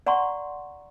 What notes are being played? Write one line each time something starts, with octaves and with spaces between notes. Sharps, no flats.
D5 F#5 A#5 C6 C#6